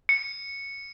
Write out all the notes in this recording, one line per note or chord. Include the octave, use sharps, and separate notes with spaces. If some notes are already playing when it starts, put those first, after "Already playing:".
C#7